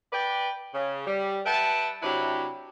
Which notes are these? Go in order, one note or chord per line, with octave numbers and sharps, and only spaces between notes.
B4 D5 G5
C#3
G3
B4 E5 F#5 G5 A5
C3 F#3 D4 E4 G4 B4